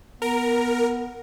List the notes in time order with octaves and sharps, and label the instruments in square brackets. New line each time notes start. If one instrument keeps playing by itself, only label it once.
[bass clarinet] B3 [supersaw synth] A#4